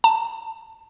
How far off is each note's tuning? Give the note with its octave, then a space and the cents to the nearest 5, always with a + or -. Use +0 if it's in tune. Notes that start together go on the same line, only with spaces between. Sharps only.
A5 +15